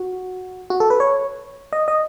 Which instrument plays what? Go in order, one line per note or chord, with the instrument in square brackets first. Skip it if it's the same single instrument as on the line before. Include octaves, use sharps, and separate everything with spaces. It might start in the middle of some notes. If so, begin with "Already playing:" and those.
Already playing: [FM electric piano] F#4
F#4
A4
B4
C#5
D#5
D#5